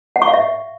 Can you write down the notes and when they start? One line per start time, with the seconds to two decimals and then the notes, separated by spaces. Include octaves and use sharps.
0.16 F#5
0.22 C#6
0.28 F5
0.33 E5